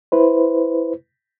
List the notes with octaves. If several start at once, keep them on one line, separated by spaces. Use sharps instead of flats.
E4 B4 C5